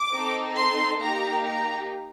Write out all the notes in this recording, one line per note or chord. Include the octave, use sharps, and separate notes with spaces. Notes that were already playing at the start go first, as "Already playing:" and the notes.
Already playing: D6
C4 D#4 A4
C6
A#3 D#4 G4 A#5
A#5